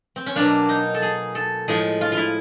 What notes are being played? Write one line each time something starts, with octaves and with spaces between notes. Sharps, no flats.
C4
C#4
B2 F#3 A#3 D4
D#4
A4
G#4
A4
A2 F3 G#3 G#4
F4
F4
E4